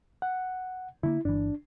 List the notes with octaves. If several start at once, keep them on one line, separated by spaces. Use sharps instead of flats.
F#5
D3 A3 A#3 E4
G1 E3 D4